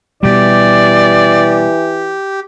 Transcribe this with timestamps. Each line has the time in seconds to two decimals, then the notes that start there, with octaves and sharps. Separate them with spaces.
0.23 B2 E3 G3 G4 D5